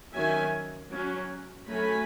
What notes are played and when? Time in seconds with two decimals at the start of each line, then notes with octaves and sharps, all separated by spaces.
0.13 D#3 F#3 C#4 E5 G#5
0.92 F#3 C#4
1.69 F#3 A3 C#4 G#5 B5